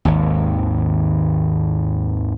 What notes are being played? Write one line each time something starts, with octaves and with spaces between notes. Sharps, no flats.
G#1 D#2